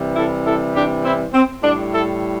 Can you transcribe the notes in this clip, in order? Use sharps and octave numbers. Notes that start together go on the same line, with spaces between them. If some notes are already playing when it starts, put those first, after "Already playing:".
Already playing: C3 E3 G3
E4 A4
E4 A4
D4 G4
C4 E4
C4
A2 G3 D4
E4 A4